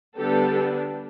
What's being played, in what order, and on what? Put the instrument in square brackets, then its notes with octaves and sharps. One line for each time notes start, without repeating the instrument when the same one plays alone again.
[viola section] D3 G3 B3 D4 G4 A4